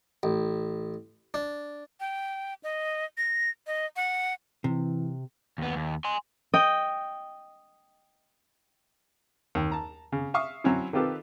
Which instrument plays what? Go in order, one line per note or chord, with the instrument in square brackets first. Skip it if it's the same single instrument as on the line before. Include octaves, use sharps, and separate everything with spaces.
[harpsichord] A1
D4
[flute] G5
D#5
A#6
D#5
F#5
[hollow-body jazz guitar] C3 [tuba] E3
[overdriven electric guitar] D#2 B3
D#2
G#5 C6
[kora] D#5 G5
[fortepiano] D#2
A5 A#5
C#3
E5 F5 C#6 D#6
F#3 C4 C#4 E4
D#3 C4 F4 G4 A4 B4